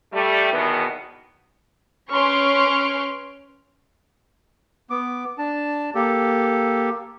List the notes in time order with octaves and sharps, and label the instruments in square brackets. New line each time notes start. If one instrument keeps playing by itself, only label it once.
[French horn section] G3 A3
E2 B2 D#3 B3
[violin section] C#4 B4 C6 C#6 F6 D7
[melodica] B3 D6
D4 A5
A#3 G4 A4